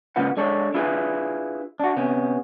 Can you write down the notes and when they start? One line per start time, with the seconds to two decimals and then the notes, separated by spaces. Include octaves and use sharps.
0.16 G#2 C#3 A#3 F4 B4 F#5
0.37 G#3 D4 A4 C#5
0.74 D4 E4 F4 G#4 B4
1.80 D4 F#4
1.96 C3 B3 C#4